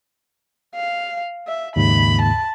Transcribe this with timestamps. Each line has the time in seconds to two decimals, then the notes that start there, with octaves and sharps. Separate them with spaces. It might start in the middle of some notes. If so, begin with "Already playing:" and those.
0.75 F5
1.47 E5
1.76 D#2 G#2 C#3 B5
2.22 A5